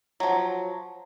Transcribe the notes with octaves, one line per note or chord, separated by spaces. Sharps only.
F3 F#3